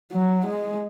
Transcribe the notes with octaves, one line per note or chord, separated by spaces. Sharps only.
F#3
G#3